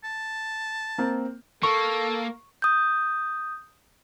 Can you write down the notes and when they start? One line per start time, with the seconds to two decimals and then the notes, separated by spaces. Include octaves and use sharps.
0.04 A5
0.98 A#3 C4
1.63 A#3 A4 C#6
2.62 D#6 G6